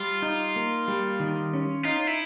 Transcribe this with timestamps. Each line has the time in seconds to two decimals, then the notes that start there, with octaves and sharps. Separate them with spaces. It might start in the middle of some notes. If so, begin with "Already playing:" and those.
Already playing: G3 F4
0.22 D#4
0.56 A#3
0.88 G3
1.20 D#3
1.53 C#4
1.85 D#4 F4
2.07 E4